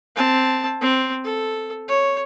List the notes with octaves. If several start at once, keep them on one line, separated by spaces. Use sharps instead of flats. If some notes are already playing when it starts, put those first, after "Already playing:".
C4 A5
C4
A4
C#5